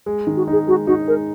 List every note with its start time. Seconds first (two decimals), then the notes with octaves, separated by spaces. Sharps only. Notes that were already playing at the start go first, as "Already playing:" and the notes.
0.06 G#3
0.27 D#3
0.36 F#4
0.47 D#4 G#4
0.67 G#3 F#4
0.87 D#4 F#4
1.07 G#3 A#4